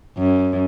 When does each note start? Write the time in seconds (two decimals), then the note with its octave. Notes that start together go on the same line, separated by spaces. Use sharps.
0.17 F#2